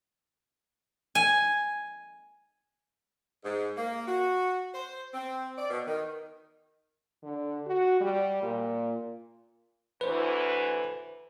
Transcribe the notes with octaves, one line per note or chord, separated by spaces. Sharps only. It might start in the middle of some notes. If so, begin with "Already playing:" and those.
G#5
G#2
A#3
F#4
C5
C4
D5
B2
D#3
D3
F#4
G3
A#2
D2 E3 B4 C5